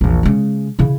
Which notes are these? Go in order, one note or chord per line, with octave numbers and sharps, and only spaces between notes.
A#1 E2
C#3 G#3
C#3 E4